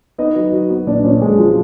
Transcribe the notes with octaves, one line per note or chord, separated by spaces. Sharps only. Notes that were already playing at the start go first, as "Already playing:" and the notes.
B3 D#4 D#5
F#3
F#3
B3
A#2 D4 D5
A#2 C#4 C#5
A#2 G#3 G#4
F3 F#3 F4